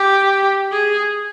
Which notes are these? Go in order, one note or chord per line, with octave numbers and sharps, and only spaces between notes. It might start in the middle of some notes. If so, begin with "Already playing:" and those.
Already playing: G4
G#4